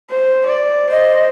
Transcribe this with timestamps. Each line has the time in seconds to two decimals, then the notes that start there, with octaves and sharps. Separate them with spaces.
0.11 C5
0.46 D5
0.90 C5 D#5